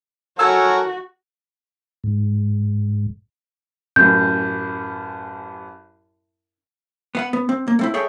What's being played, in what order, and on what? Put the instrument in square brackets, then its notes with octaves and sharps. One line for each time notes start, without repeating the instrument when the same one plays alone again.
[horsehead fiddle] F#4 [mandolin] A4 G#5 E6 [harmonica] A#4 C#5 F#5
[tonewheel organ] G#2
[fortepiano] A1 F#2 [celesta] G6
[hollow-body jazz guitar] B3 F5 F#5
B3
C4
A#3
A3 C4 E4
G#4 A4 C#5 E5 G5